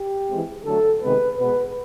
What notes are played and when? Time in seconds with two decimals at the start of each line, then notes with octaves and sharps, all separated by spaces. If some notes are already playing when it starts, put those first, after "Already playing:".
Already playing: G4
0.28 E3 G#3 C4
0.65 D3 F#3 A3 A4
1.01 C3 D#3 G#3 B3 B4
1.39 B2 G#3 B3 B4